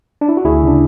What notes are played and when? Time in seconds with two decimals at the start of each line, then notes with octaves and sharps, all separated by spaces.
0.21 D4
0.29 E4
0.37 F#4
0.45 D2 E4 G#4
0.62 C#3 D4